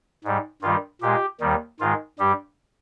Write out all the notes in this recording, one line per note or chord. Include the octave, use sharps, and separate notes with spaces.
G#2 G3
G2 D#3 G3 F4
A#2 G#3 G4
D#2 D#3 G3
G#2 D#3 G#3 F4
G2 G3 G4